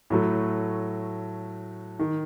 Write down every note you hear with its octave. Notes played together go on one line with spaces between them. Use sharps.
A2 F#3 A3
D#3